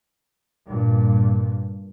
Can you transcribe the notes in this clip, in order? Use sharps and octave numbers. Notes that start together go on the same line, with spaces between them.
G2 A#2